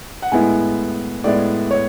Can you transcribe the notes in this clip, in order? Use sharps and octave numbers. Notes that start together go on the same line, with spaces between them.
F#5
A2 G#3 B3 E4 G#5
A2 G#3 B3 E4 D5
C#5